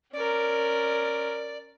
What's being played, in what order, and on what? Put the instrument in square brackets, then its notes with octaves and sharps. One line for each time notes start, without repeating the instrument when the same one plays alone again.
[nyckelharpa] C#4 A#4 [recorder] D5